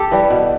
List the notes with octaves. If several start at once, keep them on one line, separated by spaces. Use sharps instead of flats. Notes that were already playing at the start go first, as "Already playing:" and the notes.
Already playing: G4 A4
E3 G3
B2